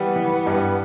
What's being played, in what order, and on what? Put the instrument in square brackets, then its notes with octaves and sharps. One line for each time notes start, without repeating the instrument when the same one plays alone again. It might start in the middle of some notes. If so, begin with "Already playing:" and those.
Already playing: [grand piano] E3 G3 [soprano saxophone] B3
[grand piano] E3
G2